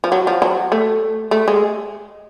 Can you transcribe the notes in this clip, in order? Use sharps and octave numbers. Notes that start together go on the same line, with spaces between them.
F3
F#3
F3
F#3
A3
A3
G#3